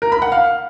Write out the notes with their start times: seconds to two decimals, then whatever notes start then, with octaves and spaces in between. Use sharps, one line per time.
0.02 A#4
0.12 B5
0.22 F#5
0.32 F5